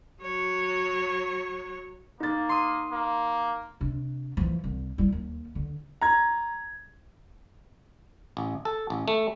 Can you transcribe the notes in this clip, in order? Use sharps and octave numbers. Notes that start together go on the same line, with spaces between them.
F#3 C#5
A#3 D#4 A6
C6 D#6
A#3
C3 D4
E3 F3
C2
G3 E4
D#2
D3
A#5 G#6
A1
A4
A1
A3